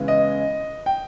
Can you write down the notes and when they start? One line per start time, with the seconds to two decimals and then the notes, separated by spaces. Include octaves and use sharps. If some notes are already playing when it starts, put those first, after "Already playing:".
Already playing: C#3 E3 G#3 B3
0.08 D#5
0.86 G5